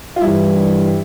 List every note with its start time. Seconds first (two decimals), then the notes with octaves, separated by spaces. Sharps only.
0.16 F4
0.21 G2 E3 G3 E4